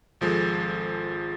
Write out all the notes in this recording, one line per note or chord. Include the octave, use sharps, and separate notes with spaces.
G#1 F3 G#3 A4